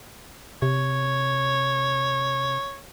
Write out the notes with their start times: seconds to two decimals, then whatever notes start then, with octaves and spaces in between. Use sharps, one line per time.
0.62 C3 C#5